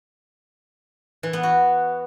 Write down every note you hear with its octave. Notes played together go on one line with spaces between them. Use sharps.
E3
B3
F#4